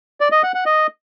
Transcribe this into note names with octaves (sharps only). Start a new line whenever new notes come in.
D5
D#5
F#5
F#5
D#5